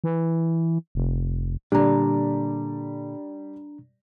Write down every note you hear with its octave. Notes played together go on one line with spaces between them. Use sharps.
E3
F1
A#2 D3 G3 D4 D5 A#5